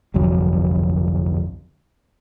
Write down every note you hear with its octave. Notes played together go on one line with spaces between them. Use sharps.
G1 C2 F2 F#3